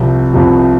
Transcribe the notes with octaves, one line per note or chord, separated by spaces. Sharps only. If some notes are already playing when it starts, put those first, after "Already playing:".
Already playing: C2 C3 F3
C2 C3 F3